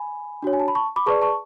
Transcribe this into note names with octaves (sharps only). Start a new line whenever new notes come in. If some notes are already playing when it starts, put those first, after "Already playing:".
Already playing: G#5 B5
D4 F#4 C#5
G#5
A5
B5
A5 C#6
B5 D6
G#4 B4 D5 A5 C#6
A5 C#6